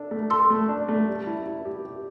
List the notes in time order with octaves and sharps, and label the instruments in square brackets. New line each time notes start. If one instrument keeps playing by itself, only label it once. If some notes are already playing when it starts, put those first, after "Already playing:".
Already playing: [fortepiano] D4 A4
A3
[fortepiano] A4 [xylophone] C6 E6
[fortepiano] A3
D4
A3
G3
E4
E4
G4
G4